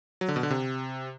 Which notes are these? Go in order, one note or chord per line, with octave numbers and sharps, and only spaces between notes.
F#3
D3
B2
D3
C3